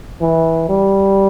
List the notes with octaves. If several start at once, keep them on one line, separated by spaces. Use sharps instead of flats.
E3
G3